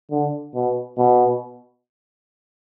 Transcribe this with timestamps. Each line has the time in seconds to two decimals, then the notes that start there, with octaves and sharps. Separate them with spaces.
0.11 D3
0.56 B2
0.98 B2